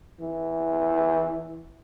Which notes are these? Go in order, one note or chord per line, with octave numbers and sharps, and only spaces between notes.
E3